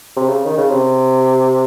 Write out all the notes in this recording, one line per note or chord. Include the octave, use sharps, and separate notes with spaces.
C3
C#3
D#3
C#3
C3